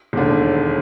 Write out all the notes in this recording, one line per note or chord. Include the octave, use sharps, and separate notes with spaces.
E1 D#2 D3